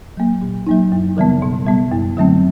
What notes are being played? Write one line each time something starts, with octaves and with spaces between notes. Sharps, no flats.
F#3 A#3
A#2
F#3 A#3 D#4
F#2
C#3 E3 G3 B3
B2
G3 B3
F#2
D3 F#3 A3 C4